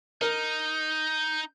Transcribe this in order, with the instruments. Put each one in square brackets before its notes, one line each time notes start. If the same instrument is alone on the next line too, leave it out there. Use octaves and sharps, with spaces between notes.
[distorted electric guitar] D#4 [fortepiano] A#4 [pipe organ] G6